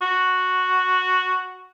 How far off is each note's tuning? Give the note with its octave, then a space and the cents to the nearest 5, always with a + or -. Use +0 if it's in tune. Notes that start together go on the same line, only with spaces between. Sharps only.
F#4 -5